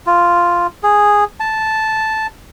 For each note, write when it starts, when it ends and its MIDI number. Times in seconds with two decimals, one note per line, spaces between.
0.06 0.67 65
0.83 1.24 68
1.40 2.27 81